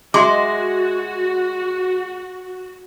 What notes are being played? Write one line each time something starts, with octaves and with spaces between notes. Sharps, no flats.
G#3 F#4 E5 C6 D6